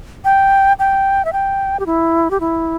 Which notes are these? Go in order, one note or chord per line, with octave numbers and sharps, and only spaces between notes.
G5
G5
E5
G5
G4
E4
G4
E4